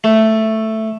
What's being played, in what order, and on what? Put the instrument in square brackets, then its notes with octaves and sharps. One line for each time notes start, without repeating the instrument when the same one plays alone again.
[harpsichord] A3